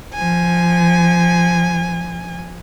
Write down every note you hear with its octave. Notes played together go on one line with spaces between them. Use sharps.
F3 G#5